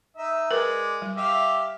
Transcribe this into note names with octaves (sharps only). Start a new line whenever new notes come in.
D#4 D#5 E5
G#3 A#4 B4 D5
G3
G4 E5 F5